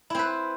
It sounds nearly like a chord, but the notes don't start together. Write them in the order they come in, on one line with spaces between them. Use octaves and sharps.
E4 C4 B4